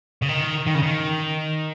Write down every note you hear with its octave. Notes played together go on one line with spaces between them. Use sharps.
C#3
D#3
D#3
C#3
D#3